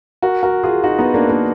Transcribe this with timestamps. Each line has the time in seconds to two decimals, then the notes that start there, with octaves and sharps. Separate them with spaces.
0.22 F#4 A#4
0.43 F#4 A#4
0.63 F4 G#4
0.84 D#4 F#4
0.98 B3 D#4
1.14 A#3 D4
1.29 A#3 D4